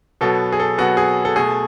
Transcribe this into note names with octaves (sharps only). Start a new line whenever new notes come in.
B2 F#3 B3 A4
G#4
A4
B2 F#3 B3 F#4
G#4
A4
B2 A3 G#4